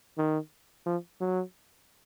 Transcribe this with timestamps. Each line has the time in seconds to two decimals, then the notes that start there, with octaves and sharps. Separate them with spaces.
0.18 D#3
0.86 F3
1.21 F#3